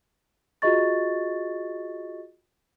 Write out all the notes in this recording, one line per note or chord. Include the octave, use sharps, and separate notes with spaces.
F4 F#4 G#4 D#5 C#6 A6